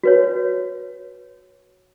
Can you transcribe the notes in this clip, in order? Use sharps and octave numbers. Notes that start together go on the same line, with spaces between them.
F#4 B4 C#5